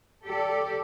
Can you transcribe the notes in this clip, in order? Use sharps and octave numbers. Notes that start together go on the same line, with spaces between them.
G4 A4 D5